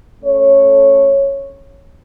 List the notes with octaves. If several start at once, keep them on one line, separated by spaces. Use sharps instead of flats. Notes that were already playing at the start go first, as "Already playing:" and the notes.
A3 C#4 A4 C#5